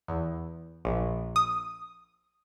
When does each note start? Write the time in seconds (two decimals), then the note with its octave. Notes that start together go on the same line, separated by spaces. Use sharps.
0.08 E2
0.85 A#1
1.36 D#6